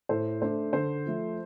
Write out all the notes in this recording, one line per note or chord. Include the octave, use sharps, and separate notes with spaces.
A2 A4 C5
A3 D4 A4 C5
D3 A4 C5
F3 A3